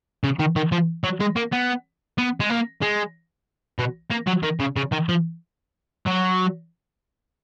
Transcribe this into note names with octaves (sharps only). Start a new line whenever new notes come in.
C#3
D#3
D#3
F3
F#3
G#3
A#3
B3
B3
G#3
A#3
G#3
B2
A#3
F#3
D#3
C#3
C#3
D#3
F3
F#3